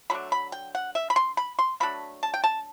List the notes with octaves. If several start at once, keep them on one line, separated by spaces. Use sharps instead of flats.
D3 F#3 A3 D4 B5
B5
G5
F#5
E5
B5
C6
B5
C6
C3 F#3 A3 D4 B5
A5
G5
A5